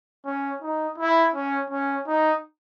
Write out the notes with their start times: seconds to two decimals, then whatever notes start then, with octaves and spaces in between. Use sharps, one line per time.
0.25 C#4
0.62 D#4
0.98 E4
1.34 C#4
1.70 C#4
2.07 D#4